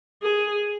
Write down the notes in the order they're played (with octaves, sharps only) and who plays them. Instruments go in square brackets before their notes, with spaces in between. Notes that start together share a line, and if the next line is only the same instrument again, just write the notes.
[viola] G#4